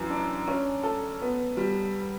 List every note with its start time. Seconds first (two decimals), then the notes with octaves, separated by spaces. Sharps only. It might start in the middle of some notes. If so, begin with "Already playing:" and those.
Already playing: F#2 E3
0.10 D4
0.47 C#4
0.83 A4
1.21 B3
1.57 G3